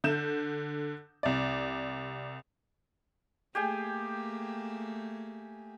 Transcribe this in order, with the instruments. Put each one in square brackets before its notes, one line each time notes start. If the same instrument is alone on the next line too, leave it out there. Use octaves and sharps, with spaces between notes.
[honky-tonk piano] D3 G6 E7
C2 D5
[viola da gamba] A3 A#3 [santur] G4 G#4 G5